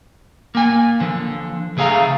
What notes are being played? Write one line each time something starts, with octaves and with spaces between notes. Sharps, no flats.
A#3 G#5
D3 F3
C#3 A3 G#4 F5 A#5